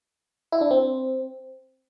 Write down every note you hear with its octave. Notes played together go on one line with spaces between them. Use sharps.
E4
D4
C4